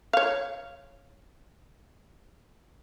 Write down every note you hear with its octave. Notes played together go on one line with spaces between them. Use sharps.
C#5 F5